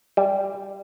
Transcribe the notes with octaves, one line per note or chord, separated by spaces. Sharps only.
G3